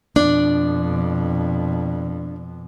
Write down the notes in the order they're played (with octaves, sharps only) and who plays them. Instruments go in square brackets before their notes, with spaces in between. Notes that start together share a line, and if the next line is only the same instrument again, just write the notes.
[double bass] F2 B2 [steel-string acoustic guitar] D4 D5